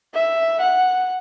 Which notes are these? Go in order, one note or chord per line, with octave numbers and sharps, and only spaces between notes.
E5
F#5